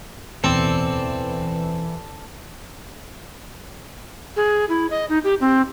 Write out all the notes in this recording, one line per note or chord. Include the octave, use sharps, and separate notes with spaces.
D1 E2 B2 E3 C4 A4 D5
G#4
E4
D#5
D#4
G4
C4